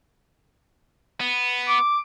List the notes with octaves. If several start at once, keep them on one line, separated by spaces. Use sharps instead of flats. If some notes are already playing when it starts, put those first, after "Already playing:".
B3
D6